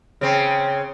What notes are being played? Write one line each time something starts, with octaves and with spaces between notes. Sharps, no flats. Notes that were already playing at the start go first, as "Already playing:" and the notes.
C#3 C4